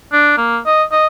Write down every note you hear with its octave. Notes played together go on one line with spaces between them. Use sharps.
D4
A#3
D#5
D#5